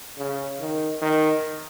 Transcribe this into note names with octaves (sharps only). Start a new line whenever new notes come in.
C#3
D#3
D#3